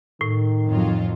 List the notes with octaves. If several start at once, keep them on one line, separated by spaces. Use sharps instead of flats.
A2 D#3
F2 F#3 F4